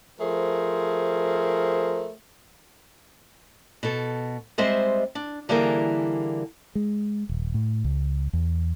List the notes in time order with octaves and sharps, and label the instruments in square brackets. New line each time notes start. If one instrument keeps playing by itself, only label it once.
[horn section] F3 A3 G#4 A#4 C5
[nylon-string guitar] B2 A4
G3 G#3 C4 C5 D#5 E5
D4
D3 E3 G3 A#3 G#4 A#4
[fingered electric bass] G#3
D#1
A2
C#2
E2